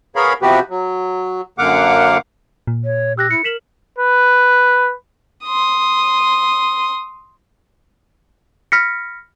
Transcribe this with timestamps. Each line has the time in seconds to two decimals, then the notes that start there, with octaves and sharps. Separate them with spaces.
0.16 B3 G#4 A#4 C#5 F5 B5
0.42 C3 F3 B3 F#4 G4 B4
0.70 F#3
1.59 F#2 D3 A#3 F5 F#5 D6
2.67 A#2
2.85 C#5
3.17 G4 E6 F#6 A#6
3.31 E4 C#7
3.44 A#4 B6 E7 F#7
3.98 B4
5.44 C6 D#6
8.72 B5 F6 A#6 B6 C#7